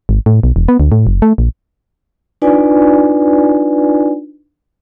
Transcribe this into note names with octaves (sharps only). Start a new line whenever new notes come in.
G#1
A2
B1
E1
B3
D2
A2
F#1
A3
A#1
D4 D#4 F4 B4 D5 G#5